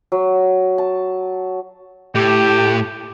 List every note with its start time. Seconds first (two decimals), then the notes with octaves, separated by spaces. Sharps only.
0.12 F#3
0.78 A5
2.15 A2 G4